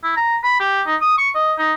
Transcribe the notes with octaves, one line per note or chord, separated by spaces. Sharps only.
E4
A#5
B5
G4
D#4
D#6
C#6
D#5
D#4